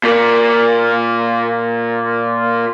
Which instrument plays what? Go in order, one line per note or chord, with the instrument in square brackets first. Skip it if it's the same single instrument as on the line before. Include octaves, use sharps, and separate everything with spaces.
[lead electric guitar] A#2 A#3